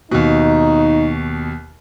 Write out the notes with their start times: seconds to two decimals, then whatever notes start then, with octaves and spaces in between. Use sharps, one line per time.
0.12 D#2 B2 D#4